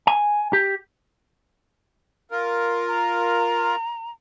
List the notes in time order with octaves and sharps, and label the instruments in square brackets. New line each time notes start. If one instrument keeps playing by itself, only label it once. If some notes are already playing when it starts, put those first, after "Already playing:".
[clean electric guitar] G#5
G4
[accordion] F4 A#4
[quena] A#5